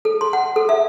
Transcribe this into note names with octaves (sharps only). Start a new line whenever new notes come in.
A4
C6
F#5
A4
E5